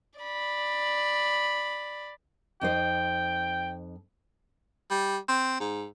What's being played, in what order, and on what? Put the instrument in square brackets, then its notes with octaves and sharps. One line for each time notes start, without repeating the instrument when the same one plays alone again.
[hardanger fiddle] D5 B5
[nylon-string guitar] F2 D#4 C5 [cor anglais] G5
[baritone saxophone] G3
C4
G#2